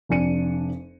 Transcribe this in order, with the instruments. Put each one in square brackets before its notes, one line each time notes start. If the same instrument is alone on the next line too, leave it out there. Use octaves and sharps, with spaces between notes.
[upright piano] F1 F2 D4 G#5 C#7 D#7